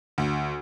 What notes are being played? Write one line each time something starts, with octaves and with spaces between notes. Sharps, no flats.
D2